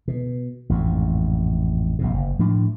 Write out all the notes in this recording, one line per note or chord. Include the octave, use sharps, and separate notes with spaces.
B2
A1 F2 G#2
A#1 G2 C3
F#1
A2 F3 D4